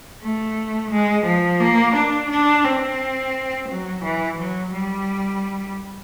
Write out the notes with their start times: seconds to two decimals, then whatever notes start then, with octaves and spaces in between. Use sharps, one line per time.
0.22 A3
0.91 G#3
1.26 F3
1.60 A#3
1.95 D4
2.30 D4
2.65 C4
3.69 F#3
4.03 E3
4.38 F#3
4.73 G3